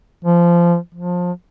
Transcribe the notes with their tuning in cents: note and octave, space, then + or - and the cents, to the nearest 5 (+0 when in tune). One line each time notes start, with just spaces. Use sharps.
F3 -20
F3 +25